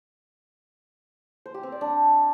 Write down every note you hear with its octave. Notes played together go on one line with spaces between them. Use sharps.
C5
G4
C4
D5
D4